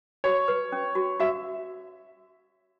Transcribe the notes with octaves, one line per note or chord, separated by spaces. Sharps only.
F#4 C#5
B4
C#4
F#4
F#4 E5